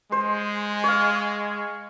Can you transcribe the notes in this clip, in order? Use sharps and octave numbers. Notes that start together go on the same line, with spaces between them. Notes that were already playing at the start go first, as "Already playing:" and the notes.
G#3 C5
C#5 F5